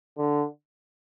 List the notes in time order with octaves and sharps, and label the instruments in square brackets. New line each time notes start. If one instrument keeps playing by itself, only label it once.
[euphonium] D3